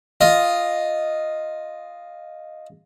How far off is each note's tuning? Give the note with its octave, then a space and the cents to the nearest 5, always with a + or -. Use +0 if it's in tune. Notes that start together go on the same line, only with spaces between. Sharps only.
F4 +0 D#5 +0